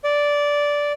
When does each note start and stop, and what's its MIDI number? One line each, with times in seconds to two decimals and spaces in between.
0.04 0.92 74